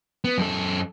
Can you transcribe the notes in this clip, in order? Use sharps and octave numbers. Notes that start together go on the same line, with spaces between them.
B3
F#2 A4